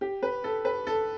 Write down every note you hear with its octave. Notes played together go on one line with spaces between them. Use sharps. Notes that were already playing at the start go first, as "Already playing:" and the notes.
G4
B4
A4
B4
A4